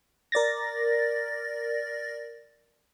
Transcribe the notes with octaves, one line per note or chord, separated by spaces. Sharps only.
A#4 D5 A6 A#6